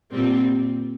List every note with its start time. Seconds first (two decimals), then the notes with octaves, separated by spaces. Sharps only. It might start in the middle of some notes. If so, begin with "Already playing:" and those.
0.12 A#2 G3 C4